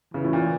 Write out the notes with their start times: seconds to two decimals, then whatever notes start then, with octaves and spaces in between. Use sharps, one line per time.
0.14 C#3 E3
0.24 A2
0.33 A#2